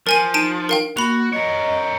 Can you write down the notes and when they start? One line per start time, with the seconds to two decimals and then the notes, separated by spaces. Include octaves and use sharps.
0.07 F3 A#4 G#5 D#7
0.34 D#4 A5 D7 D#7
0.69 A#4 F5 G5
0.97 A#3 F#4 B5 F7
1.33 A#4 C#5 D#5